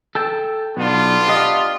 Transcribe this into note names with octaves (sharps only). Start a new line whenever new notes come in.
A4 G5 A5
B1 B3 D4 F4
G4 D#5